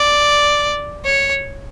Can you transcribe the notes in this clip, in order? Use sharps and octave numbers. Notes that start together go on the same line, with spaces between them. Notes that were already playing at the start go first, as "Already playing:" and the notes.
Already playing: D5
C#5